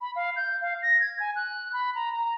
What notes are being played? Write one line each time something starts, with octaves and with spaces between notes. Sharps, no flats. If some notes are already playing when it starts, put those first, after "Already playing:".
B5
F5
G6
F5
A#6
G#6
G#5
F#6
B5
A#5
A#5